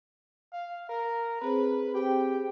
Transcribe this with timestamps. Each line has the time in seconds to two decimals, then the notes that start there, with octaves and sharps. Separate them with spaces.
0.53 F5
0.89 A#4
1.41 C4 G#4 B4 C5
1.95 G4 G5